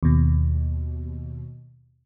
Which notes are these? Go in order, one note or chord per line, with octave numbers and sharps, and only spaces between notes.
D#2 B2